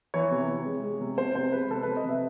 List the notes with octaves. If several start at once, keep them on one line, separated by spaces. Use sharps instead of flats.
E3 C#5
C3
C3
G#3
G#3
C3
C3 C5
C3 C5
G#3 B4
C3 A4
C3 B4
D#5
C3 E5